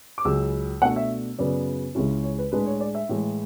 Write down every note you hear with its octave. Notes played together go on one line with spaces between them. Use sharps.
D6
C#2 C#3 F#3 E6
B2 A3 D4 F#5
E5
F#2 C#3 F#3 B3 D5
C#2 C#3 G#3 C#4 E4
C#5
B4
A2 G#3 D4 B4
C#5
D5
E5
A2 E3 G#3